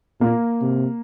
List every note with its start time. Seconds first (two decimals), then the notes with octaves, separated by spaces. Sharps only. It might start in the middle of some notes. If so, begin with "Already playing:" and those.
0.21 A#2 A#3
0.62 C3